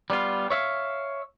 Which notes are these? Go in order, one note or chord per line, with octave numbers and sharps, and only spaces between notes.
G3 B3 F4
C#5 E5 F5